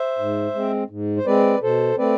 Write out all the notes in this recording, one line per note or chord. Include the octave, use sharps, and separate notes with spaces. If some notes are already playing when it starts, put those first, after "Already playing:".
Already playing: C5 E5
G#2
G#3 C4
G#2
C5
G#3 C4 B4 D5
B2 A4 C5
A3 C4 B4 D5